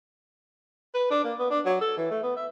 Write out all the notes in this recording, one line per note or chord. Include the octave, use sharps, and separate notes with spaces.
B4
D4
A#3
B3
D4
F#3
A4
E3
A3
B3
E5